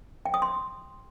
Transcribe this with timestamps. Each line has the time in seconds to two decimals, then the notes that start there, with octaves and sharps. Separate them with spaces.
0.25 G5
0.34 D#6
0.42 C6